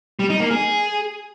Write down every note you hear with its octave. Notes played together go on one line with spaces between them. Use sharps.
G3
D#4
A#3
G#4